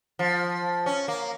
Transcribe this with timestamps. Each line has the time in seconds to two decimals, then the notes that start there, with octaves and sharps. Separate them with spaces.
0.19 F3
0.86 C#4
1.08 A#3